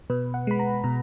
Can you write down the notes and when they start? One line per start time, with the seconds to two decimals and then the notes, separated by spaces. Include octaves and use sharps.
0.10 B2 B4
0.34 F#5
0.47 G#3 B5
0.59 A#5
0.84 B2 A#5